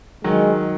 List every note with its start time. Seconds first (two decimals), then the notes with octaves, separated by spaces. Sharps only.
0.24 D#3 F#3 G#3